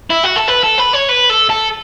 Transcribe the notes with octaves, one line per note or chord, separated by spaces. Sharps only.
E4
F#4
A4
B4
A4
B4
C#5
B4
A4
A4